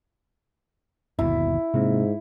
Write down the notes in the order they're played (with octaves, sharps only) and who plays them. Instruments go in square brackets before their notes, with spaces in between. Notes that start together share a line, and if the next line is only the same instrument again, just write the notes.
[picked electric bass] G1 D#2 B2 [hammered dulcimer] E4
[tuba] G#2 [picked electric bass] C3 A#3 C4